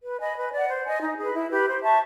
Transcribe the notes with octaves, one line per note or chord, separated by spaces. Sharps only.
B4
D#5 G#5 B5
B4
D5 F#5
C5
D#5 G#5
D#4
G#4 B4
E4
G4 B4
C5
E5 A5 C#6